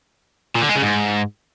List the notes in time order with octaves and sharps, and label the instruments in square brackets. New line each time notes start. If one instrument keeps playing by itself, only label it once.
[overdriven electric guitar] A#2
D3
G#3
C#3
G#2